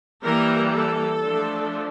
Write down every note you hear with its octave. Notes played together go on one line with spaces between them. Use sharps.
E3 G3 A#3 A#4
A4
F3 A3 D4